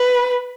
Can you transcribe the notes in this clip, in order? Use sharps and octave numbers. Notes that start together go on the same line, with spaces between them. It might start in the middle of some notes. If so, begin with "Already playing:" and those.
Already playing: B4